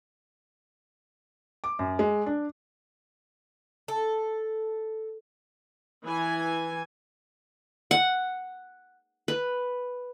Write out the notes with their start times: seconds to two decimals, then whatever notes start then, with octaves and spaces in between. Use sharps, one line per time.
1.64 D6
1.79 F#2
1.99 G#3
2.26 D4
3.88 A4
6.05 E3 G#5
7.91 F#5
9.28 B4